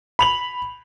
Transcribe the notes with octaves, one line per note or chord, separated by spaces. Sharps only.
B5 F7 F#7